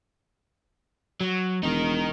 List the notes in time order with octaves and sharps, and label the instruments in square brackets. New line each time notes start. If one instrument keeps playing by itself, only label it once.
[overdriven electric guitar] F#3
[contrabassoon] E1 [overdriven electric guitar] D#4 A#4